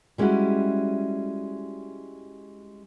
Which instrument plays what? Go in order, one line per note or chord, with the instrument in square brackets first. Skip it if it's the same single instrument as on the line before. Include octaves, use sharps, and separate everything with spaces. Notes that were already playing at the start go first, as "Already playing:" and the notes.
[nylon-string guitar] G3 G#3 C#4 E4 F#4